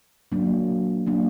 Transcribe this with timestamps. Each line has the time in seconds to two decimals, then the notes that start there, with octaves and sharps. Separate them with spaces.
0.32 F#3 A#3 D4
1.07 F#3 A#3 D4